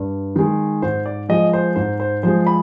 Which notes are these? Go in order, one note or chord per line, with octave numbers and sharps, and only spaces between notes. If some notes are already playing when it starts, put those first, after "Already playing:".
Already playing: G2
D#3 G#3
G#2 C5
D5
F3 G#3 D#5
C5
G#2 C5
C5
F3 G#3 C5
B5